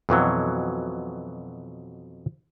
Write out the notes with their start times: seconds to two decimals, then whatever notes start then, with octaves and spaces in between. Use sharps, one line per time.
0.09 F2 B2 E3 F#3